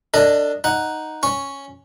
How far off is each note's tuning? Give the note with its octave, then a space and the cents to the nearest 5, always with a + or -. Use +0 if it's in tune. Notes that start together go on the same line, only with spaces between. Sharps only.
D4 +0 A4 +40 D#5 +0
D#4 +0 F#5 +0
C#4 +0 C#6 +0